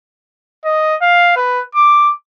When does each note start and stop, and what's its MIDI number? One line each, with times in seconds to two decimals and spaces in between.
0.65 0.95 75
1.01 1.35 77
1.36 1.62 71
1.75 2.12 86